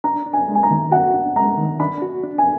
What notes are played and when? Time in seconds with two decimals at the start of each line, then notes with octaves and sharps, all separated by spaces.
0.04 D4 A#5
0.26 D4
0.33 G#5
0.48 G#3
0.55 G#5
0.63 A#5
0.71 D#3
0.92 F#4 F#5
1.14 D4
1.36 G#3 A#5
1.57 D#3
1.80 D4 B5
2.02 F#4
2.23 D4
2.38 G#5